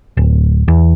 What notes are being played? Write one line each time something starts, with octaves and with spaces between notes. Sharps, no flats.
D1
E2